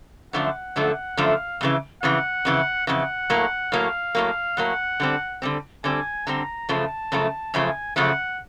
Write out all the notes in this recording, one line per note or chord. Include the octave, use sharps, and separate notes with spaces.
F#2 D3 F3 A3 F#5
F#2 D3 F3 A3
F#2 D3 F3 A3 F5
F2 C#3 E3
F2 C#3 E3 F#5
F2 C#3 E3
F2 C#3 E3 F#5
A2 F#3 A#3
A2 F#3 A#3 F5
A2 F#3 A#3
A2 F#3 A#3 F#5
D3 G3 C4
D3 G3 C4
D3 G3 C4 G#5
D3 G3 C4 A#5
F#2 C#3 F3 A3 A5
F#2 C#3 F3 A3
F#2 C#3 F3 A3 G#5
F#2 C#3 F3 A3 F#5